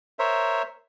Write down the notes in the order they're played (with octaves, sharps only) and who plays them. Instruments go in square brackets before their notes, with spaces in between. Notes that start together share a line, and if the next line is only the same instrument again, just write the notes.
[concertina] A#4 C5 C#5 E5